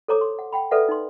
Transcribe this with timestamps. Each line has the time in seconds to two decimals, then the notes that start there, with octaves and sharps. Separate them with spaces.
0.08 A4 C5 C#5 A#5 D6
0.21 C6
0.39 F#5
0.53 F#5 G5 B5
0.71 A4 B4 D5 E5 F#5
0.89 D#4 C6